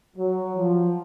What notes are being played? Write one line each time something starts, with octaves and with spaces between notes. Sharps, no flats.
F#3
F3